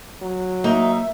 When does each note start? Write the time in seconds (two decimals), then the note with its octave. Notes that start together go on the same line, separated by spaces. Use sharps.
0.22 F#3
0.64 A#3 D#4 E5